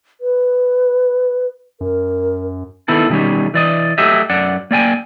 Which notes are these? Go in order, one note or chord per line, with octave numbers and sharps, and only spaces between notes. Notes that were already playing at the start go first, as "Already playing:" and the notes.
B4
F#2 A#4
D#3 B3 E4 A4
B2 D#3 F3 G3 C#4
E3 D5 D#5
F#3 A3 G4 D#5 E5
F#2 D5 F#5
A#3 D5 G5 G#5